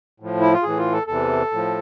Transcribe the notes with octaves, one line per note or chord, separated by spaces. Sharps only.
A2 F3
E4
F4
A2 E3 G#4
F4
A4
E2 C3 E3 A4
A2 F3